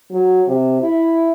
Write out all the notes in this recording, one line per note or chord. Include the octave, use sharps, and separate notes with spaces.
F#3
C3
E4